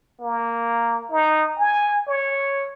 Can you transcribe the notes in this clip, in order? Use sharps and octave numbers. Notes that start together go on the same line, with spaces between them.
A#3
D#4
G#5
C#5